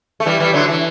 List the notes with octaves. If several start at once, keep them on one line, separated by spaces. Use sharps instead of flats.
A3
E3 G3
E3 G3
D3 F#3
E3